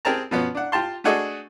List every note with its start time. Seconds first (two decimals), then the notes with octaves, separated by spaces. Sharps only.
0.05 C4 G4 G#4 A#4 A5 A#5
0.31 B2 F3 B3 C#4
0.55 D4 F#5
0.72 F4 G4 A5 C6
1.04 A3 D4 F#4 G#4 A4 D#5